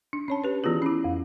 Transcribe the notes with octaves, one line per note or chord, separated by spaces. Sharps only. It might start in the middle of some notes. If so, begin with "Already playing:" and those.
D4
C#4 C#5 A5
G4 B4
E3 B3 E4 F4 G#4
C#4 E4
F2